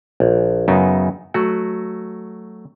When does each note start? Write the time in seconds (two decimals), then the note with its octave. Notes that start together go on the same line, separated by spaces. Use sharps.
0.20 A#1
0.68 F#2 C#3 F#3 B3 D#4
1.34 F#3 A3 F#4